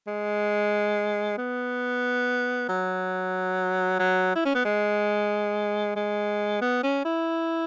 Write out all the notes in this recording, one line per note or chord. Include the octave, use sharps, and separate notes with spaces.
G#3
B3
F#3
F#3
E4
C#4
B3
G#3
G#3
B3
C#4
E4